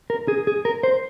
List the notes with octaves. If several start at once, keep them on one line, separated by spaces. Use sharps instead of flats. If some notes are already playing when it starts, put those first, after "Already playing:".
A#4
G#4
G#4
A#4
C5